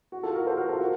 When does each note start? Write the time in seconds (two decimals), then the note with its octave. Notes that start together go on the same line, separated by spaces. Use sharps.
0.12 F#4
0.23 F4 A4
0.35 F#4 A#4
0.46 A4 C5
0.57 F#4 A#4
0.69 F4 A4
0.80 F#4